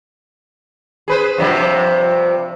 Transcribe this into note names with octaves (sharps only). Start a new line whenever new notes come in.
G#4 B4 C5
G2 C3 F3